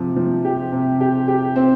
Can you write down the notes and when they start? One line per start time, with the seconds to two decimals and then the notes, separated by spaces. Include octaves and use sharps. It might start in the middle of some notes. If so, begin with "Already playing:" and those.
Already playing: C3 F3
0.16 F3
0.45 G4
0.72 C3
1.00 G4
1.28 G4
1.56 C4